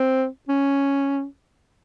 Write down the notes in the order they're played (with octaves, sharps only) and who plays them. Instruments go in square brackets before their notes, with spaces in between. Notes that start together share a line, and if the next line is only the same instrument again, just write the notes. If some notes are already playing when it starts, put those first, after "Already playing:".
Already playing: [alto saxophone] C4
C#4